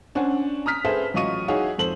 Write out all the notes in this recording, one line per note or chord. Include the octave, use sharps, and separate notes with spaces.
C#4 D4 C5 F#5 G#5
A#5 D#6 F6 B6
G#4 A4 B4 C5 E5
A1 F#3 F4 D#5 C#6 D#7
D#4 E4 F#4 G#4 C#5 F5
F2 A4 C5 F#7